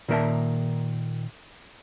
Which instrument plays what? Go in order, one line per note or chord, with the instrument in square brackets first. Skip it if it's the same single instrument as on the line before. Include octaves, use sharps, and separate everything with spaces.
[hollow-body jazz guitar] A#2 D#3 A#3 A#4 E5 A5